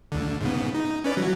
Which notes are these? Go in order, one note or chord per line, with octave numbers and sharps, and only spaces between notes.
D2 D3
G#2 C#3 B3
D#4
C#4 B4 D5
E3 F#3 F#4